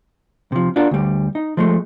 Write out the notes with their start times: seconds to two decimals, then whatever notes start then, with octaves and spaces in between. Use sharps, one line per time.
0.52 C3 F3
0.76 D4 F4 F#4 A#4
0.91 D2 G3
1.35 D#4
1.57 F3 G#3 A3